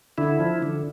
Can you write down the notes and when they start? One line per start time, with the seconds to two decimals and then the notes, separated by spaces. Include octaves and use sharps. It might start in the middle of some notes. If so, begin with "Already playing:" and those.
0.18 D3 E4
0.40 F3
0.63 D3